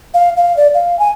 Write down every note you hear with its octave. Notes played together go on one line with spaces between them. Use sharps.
F5
F5
D5
F5
G#5